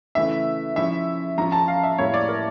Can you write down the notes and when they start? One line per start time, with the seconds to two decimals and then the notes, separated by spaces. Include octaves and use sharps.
0.15 C#3 E3 A3 C#4 E4 E5
0.76 F3 C#4 E4 E5
1.38 F3 C#4 F4 A#5
1.52 A5
1.68 F5
1.83 E5
1.98 A2 G3 A#3 E4 C#5
2.14 D5
2.29 A#4